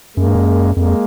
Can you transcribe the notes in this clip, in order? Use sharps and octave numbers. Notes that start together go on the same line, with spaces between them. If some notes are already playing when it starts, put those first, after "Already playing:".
F#2 G#3 A#3
G2
F#2
F2 G#3 A#3